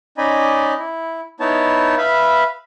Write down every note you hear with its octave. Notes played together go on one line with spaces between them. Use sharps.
C#4 D#4 D5 D#5 G#5 B5
E4
B3 D#4 E4 C#5 A5
B4 E5 F5 B5